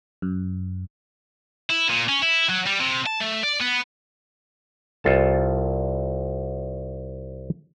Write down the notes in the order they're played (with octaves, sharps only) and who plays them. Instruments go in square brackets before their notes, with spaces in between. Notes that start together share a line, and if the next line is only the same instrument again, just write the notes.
[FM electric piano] F#2
[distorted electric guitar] E4
A#2
C#4
E4
F#3
G3
C3
A5
A3
D5
B3
[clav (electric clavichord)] C2 F4 A4 A5